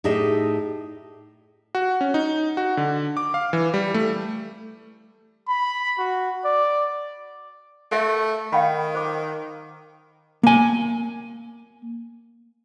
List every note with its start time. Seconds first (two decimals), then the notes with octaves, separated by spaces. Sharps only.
0.04 A2 D#4 G4 G#4 D#5 E5
1.75 F#4
2.01 C#4
2.14 D#4
2.57 F#4
2.77 D3
3.17 D6
3.34 F5
3.53 E3
3.74 G3
3.94 A3
5.48 B5
5.99 F#4
6.45 D5
7.92 A3 A#4 E5
8.53 D#3 F5 G5 B5
8.95 C5 D6
10.43 A#3 G#5